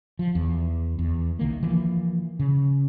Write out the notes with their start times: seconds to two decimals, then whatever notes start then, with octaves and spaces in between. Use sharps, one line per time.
0.19 F3
0.35 E2
0.99 E2
1.39 C2 D#3 A#3
1.63 E3 F3 A#3
2.39 C#3